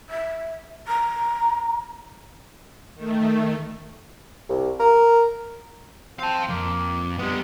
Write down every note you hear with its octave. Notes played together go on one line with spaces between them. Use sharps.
E5
A#5
D#3 A3
C2
A#4
C4 F5 A5
F2 A#3
G3 G#3 B3